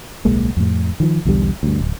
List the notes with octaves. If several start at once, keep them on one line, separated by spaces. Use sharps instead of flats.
D1 B1 G#3 A#3
F2 A2
D#3 F3
B1 E2 D3 G3
D2 G2
D1